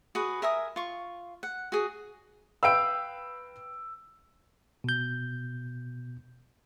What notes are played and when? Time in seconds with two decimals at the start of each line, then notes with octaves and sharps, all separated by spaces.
0.15 F#4 G#4 B4
0.42 A#4 E5 G#5 D#6
0.76 F4 C#6
1.43 F#5
1.72 F#4 G#4
2.63 B4 F5 G5 E6 D7
4.84 B2 G6